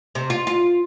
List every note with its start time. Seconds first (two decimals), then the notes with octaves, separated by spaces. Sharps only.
0.15 C3
0.30 F4
0.47 F4